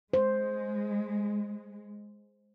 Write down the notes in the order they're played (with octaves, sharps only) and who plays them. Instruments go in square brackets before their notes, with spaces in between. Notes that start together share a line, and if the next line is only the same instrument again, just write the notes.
[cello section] G#3 [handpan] C5